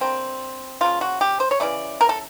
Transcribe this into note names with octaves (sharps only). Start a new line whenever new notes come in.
D3 G3 A#3 C4
C#3 F3 A#3 F4
F#4
G4
C5
C#5
C#3 E3 A3 D5
A#4
A4